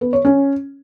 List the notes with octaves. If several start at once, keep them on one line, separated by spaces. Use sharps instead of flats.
B3
C#5
C#4